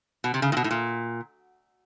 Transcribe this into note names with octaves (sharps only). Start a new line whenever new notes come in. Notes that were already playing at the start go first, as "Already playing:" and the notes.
B2
C3
C#3
A#2
B2
A2
A#2